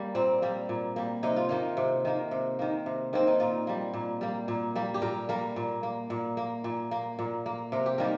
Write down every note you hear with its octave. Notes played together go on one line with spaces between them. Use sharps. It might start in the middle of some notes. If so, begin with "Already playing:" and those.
Already playing: G3 A#3
A#2 C4
G3 A#3
A#2
G3 A#3
C3 D#4
F4
D#3 A#3 D#4
C3
D#3 A#3
C3
D#3 A#3
C3
D#3 A#3 C4
D#4
A#2 F4
G3 A#3
A#2
G3 A#3
A#2
G3 A#3
G4
A#2 A#4
G3 A#3 A#4
A#2
A#3
A#2
A#3
A#2
A#3
A#2
A#3
C3 A#4
G4
D#3 G3 A#3 A#4